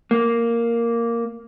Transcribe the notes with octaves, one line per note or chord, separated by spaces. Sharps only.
A#3